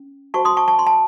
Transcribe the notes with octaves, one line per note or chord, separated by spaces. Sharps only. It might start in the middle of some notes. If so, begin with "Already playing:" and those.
Already playing: C#4
F#4 C5 A5 C#6
C6 D#6
A5 C#6
A5 C#6
C6
A5